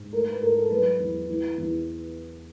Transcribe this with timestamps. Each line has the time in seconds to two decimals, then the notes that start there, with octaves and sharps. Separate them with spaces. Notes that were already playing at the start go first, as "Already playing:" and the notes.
Already playing: G#2
0.13 A3 A#4
0.27 B4
0.41 G#2 A#4
0.56 A4
0.70 F#3 B4
1.00 E2
1.29 E3
1.58 E2